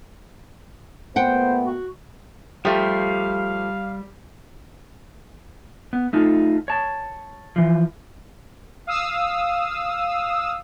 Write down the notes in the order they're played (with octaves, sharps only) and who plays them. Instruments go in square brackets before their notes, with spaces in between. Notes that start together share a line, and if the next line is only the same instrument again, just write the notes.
[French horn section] A#2 A3 B3 [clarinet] C5 [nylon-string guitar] F#5 G5
[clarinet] F#4
[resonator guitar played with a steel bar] F3 A3 [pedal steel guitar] G3 [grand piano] G4 [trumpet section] F5
[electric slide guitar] B3
A3 D#4 F4
C#5 A5
E3 F3
[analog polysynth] F5 D#6 E6